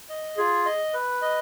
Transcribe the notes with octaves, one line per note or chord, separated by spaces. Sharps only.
D#5
F4 G#4
D#5
B4
D#5